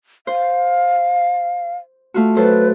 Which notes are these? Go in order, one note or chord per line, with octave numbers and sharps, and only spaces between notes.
C5 F5
A3 F4 F#4
F#3 A4 B4 C5